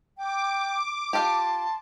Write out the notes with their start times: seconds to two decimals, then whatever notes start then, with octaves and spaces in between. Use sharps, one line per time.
0.18 G5 D6
1.13 F4 G4 A5 C6